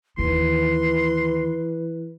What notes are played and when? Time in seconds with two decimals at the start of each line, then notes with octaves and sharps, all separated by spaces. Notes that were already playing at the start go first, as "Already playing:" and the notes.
0.18 D#2 D#3 E3 B4 C6